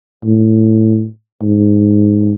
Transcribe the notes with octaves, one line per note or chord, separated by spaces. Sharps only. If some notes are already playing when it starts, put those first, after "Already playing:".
A2
G#2